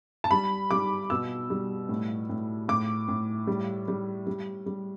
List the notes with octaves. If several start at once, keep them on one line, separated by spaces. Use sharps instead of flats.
A5
G3 B5
G3 D6
B2 E6
G3
A2
A2
A2 D6
A2
G3
G3
G3
G3